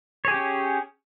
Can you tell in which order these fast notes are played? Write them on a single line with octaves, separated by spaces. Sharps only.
C#5 G#4 G4 C#4